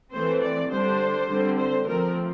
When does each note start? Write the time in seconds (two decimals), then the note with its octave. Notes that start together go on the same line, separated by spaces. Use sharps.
0.12 E3 A3 C4 C5
0.41 D5
0.69 D3 G3 D4 C5
1.27 D3 G3 C4
1.56 C5
1.86 F3 A3 C4 A#4